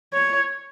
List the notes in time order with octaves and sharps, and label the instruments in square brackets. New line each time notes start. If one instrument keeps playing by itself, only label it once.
[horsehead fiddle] C#5